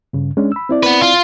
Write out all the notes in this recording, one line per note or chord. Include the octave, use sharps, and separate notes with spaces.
G2 C#3
G#3 C#4 D4
B5 E6
C4 E4 D5
B3 B4
F4